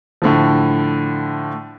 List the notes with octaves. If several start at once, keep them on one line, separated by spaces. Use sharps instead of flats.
A2 D3 F3